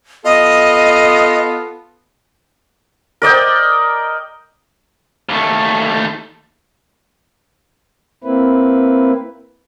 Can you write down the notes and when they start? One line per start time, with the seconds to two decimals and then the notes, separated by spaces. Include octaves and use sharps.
0.25 B3 F4 A4 D#5
3.22 A#4 D5 D#5 G5
5.29 D#2 A3
8.24 A#3 C4 E4 B4